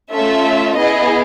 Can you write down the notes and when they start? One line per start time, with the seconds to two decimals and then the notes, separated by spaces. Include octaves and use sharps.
0.13 A3 C#4 F4 A4 E5
0.76 B3 E4 G#4 D#5